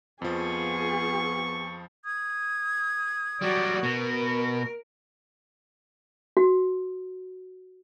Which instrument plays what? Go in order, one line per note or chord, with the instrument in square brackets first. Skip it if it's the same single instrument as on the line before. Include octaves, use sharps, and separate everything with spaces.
[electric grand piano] F2 F3 [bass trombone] B3 [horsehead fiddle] F4 G#4 [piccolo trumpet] C#6
[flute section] D#6 G#6
[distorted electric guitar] F#3 G3 [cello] F#4 D5
[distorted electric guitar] B2 [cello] A#4
[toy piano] F#4